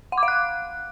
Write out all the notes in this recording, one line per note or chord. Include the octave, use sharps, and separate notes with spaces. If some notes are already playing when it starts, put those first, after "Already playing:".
F#5
D6
F5
F#6